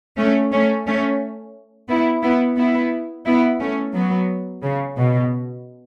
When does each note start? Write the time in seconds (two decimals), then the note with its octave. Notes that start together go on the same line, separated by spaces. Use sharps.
0.18 A3 C#4
0.52 A3 C#4
0.87 A3 C#4
1.89 B3 E4
2.23 B3 E4
2.57 B3 E4
3.26 B3 E4
3.59 A3 C#4
3.94 F#3 B3
4.63 C#3
4.97 B2